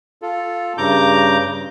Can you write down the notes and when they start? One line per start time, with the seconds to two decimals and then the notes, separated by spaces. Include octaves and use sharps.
0.22 F4 A4
0.78 G2 C#3 A#5 D6 G6